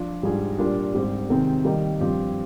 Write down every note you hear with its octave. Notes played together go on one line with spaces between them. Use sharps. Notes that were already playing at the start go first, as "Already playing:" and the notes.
Already playing: F3 D4
G#2 G3 D4 F4 G#4
A#2 G3 D4 F4 A#4
G#2 G3 C4 G4 C5
C3 D#3 G#3 C4
D#3 G3 A#3 D#4
G2 F3 C4 G4